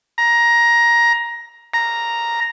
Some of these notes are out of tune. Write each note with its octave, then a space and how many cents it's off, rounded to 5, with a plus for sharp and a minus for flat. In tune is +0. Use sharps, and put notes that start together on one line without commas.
A#5 +15
A#5 +0